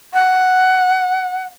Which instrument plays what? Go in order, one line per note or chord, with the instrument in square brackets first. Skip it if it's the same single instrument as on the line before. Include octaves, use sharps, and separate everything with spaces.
[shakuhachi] F#5